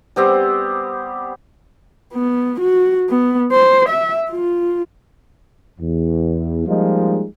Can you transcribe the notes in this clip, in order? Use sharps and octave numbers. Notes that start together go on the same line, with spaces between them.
G3 B3 C4 G4
B3
F#4
B3
C5
E5
F4
E2
F3 G3 G#3 A#3 D#4 F4